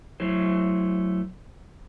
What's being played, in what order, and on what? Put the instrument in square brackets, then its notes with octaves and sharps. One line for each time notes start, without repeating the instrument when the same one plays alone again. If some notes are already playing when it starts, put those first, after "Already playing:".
[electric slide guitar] F#3 A3 E4 C5